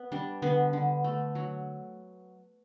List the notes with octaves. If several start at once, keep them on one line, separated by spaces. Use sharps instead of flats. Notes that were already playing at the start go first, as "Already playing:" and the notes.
Already playing: B3
G3 D4
D3 B3
D3
A3
F#3